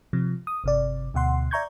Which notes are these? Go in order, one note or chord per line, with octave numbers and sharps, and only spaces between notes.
C3 F3
D#6
G1 C3 D5
D2 B2 F#5 C6
D5 E5 A#5 C#6 G6 G#6